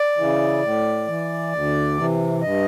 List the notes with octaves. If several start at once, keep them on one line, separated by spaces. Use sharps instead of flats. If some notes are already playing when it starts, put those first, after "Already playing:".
Already playing: D5
C#3 E3
A2
E3
D2
C3 E3
G2 D#5